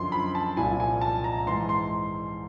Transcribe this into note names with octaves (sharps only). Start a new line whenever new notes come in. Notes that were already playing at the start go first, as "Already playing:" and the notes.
Already playing: F#2 D3 F3 C6
B5
A5
C2 A#2 F3 G#5
G#5
A5
A#5
G#2 E3 C6
C6